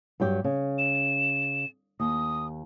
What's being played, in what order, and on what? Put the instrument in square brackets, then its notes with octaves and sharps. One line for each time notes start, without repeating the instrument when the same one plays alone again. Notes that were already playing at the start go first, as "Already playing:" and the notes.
[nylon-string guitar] G2 F#3 G4
C#3
[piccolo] E7
[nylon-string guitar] D#2 [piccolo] D#6